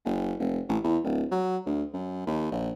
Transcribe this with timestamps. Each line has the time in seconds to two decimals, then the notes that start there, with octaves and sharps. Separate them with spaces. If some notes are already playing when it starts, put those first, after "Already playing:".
0.05 F#1
0.39 F1
0.69 A1
0.83 E2
1.04 D1
1.31 F#3
1.66 D2
1.93 F#2
2.27 D#2
2.51 A#1